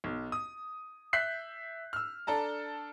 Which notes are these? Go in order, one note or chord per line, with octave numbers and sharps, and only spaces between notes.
B1
D#6
E5 F#6 G6 B6 C7
E6 F6
D4 A4 A5 A#5